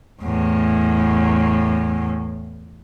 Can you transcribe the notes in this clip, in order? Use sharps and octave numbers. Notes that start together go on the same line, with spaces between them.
E2 A2